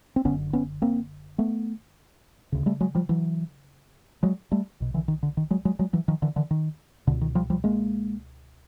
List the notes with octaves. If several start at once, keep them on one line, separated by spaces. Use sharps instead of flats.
C4
F#1 F#2 D3 B3 C#4
B3 C#4
A#3 C4
A3 B3
D2 C#3
G3 A3
F#3 G#3
F3 G3
E3 F#3
F#3 G#3
G3 A3
B1 B2
D3 E3
D#3
D3
D#3
F#3 G#3
F#3 G#3
F#3 G#3
E3 F#3
D#3 F3
D3 E3
D3 E3
D#3
C#2 B2 D3
D#3
F3 G3
F3 G3
G#3 A#3